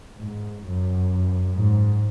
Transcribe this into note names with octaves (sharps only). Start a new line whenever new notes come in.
G#2
F#2
G#2